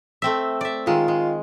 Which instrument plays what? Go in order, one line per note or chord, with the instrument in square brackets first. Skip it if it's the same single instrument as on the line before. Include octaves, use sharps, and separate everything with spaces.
[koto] A3 C4 E5
D5 E5
[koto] D#3 G#3 [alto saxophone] F4
[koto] G#3